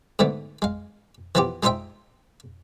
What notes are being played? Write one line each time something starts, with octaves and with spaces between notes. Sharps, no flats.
G#2 D3 A3 B3
G#3 F5
E3 F3 B3 F4 G4
G#3 D#4 F4 C5 E5 G5